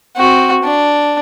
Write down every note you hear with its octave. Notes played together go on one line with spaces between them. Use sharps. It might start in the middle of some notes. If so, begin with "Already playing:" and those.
C4 F#4
D4